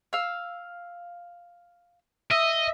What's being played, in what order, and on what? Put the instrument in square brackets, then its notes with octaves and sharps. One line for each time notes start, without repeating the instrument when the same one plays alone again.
[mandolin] F5 E6
[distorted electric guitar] D#5 [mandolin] E5